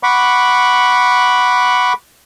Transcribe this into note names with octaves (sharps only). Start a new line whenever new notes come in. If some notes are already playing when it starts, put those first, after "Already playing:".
F#5 B5 C#6 D6